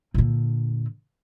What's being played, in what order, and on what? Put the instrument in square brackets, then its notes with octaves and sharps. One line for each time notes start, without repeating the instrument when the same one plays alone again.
[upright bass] A#2 D3